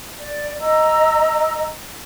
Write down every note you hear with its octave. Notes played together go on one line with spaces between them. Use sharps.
D5
D#5 A#5 E6